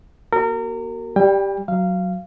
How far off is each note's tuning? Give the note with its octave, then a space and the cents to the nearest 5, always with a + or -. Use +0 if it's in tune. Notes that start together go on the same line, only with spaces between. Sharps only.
A#3 +40 F#4 +30 A#4 -30
G3 +0 G5 +30
F#3 +0 F5 -15